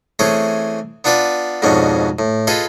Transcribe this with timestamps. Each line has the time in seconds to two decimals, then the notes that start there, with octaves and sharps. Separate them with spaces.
0.19 E3 A3 C4 C#4 G#4
1.04 B3 D4 F4 B4 D5
1.62 F2 G#2 B2 C#4 D4
2.19 A2
2.47 F4 G#4 A4 B4 D#5